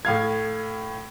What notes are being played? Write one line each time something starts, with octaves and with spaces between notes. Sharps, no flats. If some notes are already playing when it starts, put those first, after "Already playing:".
A2 F5 G#6